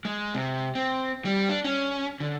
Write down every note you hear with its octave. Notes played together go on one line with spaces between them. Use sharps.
G#3
C3
C4
G3
D4
C#4
D3